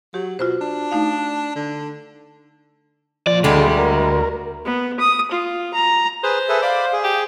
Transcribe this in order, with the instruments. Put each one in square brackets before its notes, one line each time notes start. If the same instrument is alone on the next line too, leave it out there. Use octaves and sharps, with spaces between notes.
[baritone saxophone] F#3 [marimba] G4
[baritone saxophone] B2 [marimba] F4 F#4 C5
[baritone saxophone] D4
[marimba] A3 D#4 F5
[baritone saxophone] D3
[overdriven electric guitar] A#2 D5 [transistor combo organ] F3
[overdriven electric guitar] D2 [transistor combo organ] D3 A4 [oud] G3 G#3
[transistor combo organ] A#4
[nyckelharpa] B3
D#6
F4
A#5
[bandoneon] G#4 B4 [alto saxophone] C5
[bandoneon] G#4 A4 B4 [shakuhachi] E5
[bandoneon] D5 B5 D6 [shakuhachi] F5
[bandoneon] G#4
[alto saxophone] G4